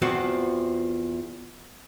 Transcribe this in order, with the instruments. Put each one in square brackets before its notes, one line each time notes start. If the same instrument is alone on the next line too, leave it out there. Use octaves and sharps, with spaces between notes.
[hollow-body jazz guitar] E2 F3 C4 F#4